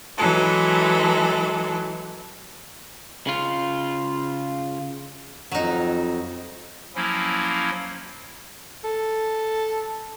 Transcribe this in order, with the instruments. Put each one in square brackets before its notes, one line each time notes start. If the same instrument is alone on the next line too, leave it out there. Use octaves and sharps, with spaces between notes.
[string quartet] E3 F#3 G#3 A4
[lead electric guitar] C#3 F4
[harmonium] F2 [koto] F#3 D#4
[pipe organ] F3 F#3 A#3 C#4 E4
[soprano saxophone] A4